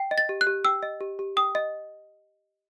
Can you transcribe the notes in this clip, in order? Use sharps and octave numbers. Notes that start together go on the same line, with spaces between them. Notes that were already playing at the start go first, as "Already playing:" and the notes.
Already playing: G5
D#5
A6
G4
F#6
G4
G5 E6
D#5
G4
G4
G5 D#6
D#5